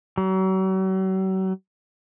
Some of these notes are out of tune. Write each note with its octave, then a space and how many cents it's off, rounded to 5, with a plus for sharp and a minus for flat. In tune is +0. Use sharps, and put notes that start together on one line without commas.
F#3 +40